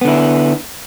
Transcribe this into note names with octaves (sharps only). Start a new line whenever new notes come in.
D3 B3 E4